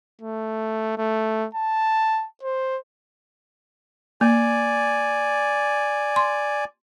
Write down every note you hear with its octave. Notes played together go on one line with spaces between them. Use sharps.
A3
A3
A5
C5
A#3 D5 G#5
C6